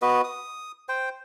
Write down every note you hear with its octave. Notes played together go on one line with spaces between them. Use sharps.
B3 F#4 B4 D#5
D#6
C5 G5